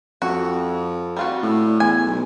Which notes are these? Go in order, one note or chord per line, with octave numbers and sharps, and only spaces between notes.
F2 F#4
G3 F4 F#4
A2
E2 G#5
B1